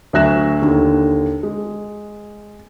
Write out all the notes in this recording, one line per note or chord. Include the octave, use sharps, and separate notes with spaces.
D2 F#3 E5 F#6 A#6 E7
D#2 D3
G#3